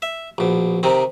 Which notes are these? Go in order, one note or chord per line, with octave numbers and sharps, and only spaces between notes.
E5
A#1 B2
C3 D#3 C4